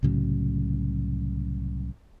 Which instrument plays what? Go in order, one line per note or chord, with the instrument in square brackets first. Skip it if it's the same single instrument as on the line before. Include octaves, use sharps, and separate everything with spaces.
[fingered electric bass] C2 A2 C#3 F#3